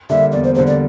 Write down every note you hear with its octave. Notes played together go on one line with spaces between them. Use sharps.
D3 G3 A#3 E5
E2 D5
C5
D3 G3 A#3 C5
D5